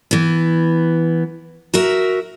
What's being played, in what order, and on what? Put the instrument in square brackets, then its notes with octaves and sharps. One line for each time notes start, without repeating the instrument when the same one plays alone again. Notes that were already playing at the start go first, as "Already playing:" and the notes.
[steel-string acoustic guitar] E3 B3
F#4 A#4 E5